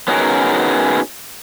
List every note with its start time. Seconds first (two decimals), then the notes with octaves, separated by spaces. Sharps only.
0.08 B3 C#4 D#4 F#4 G#4 A#4